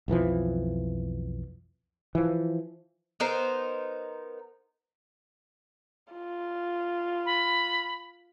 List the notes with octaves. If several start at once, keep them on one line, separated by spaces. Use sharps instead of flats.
B1 F2 E3 F3
E3 F3
B3 D#4 A#4 C5
F4
B5